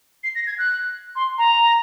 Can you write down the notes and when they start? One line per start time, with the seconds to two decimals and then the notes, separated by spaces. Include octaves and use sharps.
0.24 C7
0.35 A#6
0.47 G#6
0.58 F#6
1.16 C6
1.38 A#5